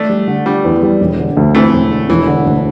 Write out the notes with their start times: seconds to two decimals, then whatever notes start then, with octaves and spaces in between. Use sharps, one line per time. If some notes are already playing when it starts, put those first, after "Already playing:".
Already playing: A3 D4
0.10 G3
0.27 D3
0.46 G3 D4
0.64 E2
0.83 G3
1.01 E1
1.19 D3
1.37 D2
1.54 E3 A3 C4
1.73 E1
1.91 D3
2.09 E1 E3
2.27 D3
2.46 D2